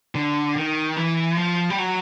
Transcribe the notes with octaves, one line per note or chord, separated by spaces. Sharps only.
D3
D#3
E3
F3
G3
F#3